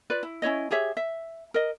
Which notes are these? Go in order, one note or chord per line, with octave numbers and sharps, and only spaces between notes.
F4 B4 D5
E4
C#4 E4 C#5 D#5
G4 G#4 C#5 E5
E5
A#4 D#5